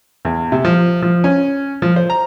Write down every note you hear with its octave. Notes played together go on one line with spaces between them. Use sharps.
E2
C3
F3
F3
C#4
F3
C5
A#5